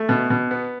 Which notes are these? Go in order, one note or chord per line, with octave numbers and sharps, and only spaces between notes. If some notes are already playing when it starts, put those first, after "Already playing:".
Already playing: A3
B2
B2
B3